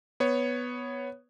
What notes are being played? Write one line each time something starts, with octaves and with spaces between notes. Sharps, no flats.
B3 C#5